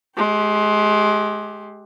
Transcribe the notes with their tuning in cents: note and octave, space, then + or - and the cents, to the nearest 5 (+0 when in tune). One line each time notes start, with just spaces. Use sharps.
G#3 +25 G4 +0